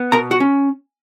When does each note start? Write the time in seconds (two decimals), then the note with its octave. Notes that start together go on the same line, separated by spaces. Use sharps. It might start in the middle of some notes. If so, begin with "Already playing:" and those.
Already playing: B3
0.12 B2 A#4 A#5
0.31 F#4 F#5
0.40 C#4